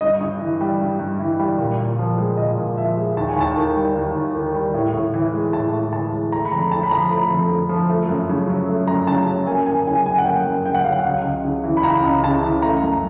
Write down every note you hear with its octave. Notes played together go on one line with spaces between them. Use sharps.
G2 D#5
G2
E3
G3
G2
G2
E3
G3
A#2
A#2
F3
G#3
A#2 D#5
A#2
F3 E5
G#3
D#2 A5
G#5
D#2 A5
D#3
G3
D#2
D#2
D#3
G3
A2
A2
E3
G#3
A2 A5
A2
E3 A5
G#3
A3 A#5
B5
F2 A#5
D3 A5
B5
F3 A#5
A3 B5
F2
D3
F3
A3
F#2
C#3
F#3
A3
F#2 A#5
C#3 A5
F#3
A#3 G#5
F#2 G#5
C#3 G#5
F#3 G#5
F#5
A#3 G5
F#2
C#3 G5
F#5
F#3 F5
F#5
C#2
C#2
C#3
E3
B5
C#2 A#5
C#2
C#3 A5
E3
A3 A#5
F#2